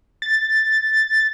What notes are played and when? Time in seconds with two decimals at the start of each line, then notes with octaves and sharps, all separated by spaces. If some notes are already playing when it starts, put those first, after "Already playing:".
0.22 A6